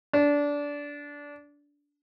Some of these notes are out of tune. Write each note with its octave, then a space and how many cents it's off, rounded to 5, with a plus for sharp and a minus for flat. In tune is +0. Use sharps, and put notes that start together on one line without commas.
D4 -20